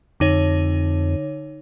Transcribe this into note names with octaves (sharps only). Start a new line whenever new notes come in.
F2 D3 D#4 C#5